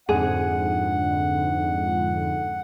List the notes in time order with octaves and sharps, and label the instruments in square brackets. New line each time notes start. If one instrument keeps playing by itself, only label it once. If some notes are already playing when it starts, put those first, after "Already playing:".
[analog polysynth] F2 G#2 D3 [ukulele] G#4 [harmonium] F#5